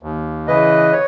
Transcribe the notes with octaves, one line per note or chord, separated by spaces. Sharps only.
D#2
C#3 E3 B4 D#5
C#5